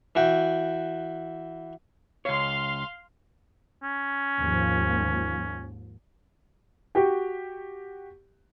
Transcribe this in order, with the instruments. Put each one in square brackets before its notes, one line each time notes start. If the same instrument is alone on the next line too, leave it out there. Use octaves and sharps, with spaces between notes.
[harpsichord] E3 F#4 G5
[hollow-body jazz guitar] C#2 C#5 [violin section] F5 C6
[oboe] C#4
[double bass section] D#2 G#2 F3
[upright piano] F#4 G4 G5